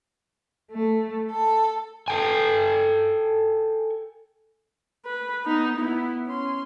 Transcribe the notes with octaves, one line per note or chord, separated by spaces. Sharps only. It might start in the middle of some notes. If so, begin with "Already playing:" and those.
A3
A4
A4 G5 G#5
B4
B3 D#4
B3 E4
C#4 C6